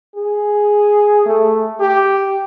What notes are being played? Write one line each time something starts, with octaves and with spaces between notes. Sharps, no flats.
G#4
A3
G4